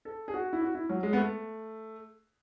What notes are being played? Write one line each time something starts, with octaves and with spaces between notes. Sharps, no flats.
A4
G#4
F#4
E4
F#4
E4
F#3
G#3
B3
A3